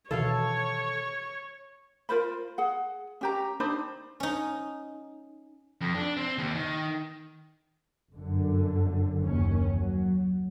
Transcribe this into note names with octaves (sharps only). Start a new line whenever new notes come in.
B2 D#3 E3 A4 C#5 F5
F4 A#4 C5 B5
G#4 F#5
C#4 G4 A#5
D4 D#4 C5 B5
C#4 D#4
F2
D4
C4
D#2
D#3
G1 F#2 D3
F#1 D#2 D#3 C#4
F#3